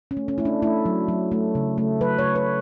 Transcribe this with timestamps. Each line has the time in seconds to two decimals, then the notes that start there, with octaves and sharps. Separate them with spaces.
0.11 C#4
0.17 A3
0.28 C#4
0.38 A3 E4
0.45 D4
0.62 A3 E4
0.86 F#3
1.08 F#3
1.32 A3
1.55 C#3
1.78 A3
2.01 F#3 B4
2.19 C#5
2.24 C#3
2.36 B4